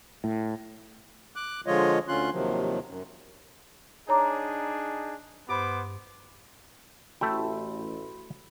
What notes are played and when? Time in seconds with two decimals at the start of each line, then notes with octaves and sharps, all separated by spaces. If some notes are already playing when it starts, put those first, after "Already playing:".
0.24 A2
1.36 D6 F#6
1.67 D3 F3 G#3 F4 C#5 D#5
2.08 D2 D3 C#4 F4 C6 F#6
2.32 D#2 C3 D#3 F3 F#3
2.87 F#2
4.09 D4 D#4 G#4 C#5 A#5 D6
5.49 G2 B3 C5 B5 D6
7.21 A1 A3 F#4 E5 G5 B5 C6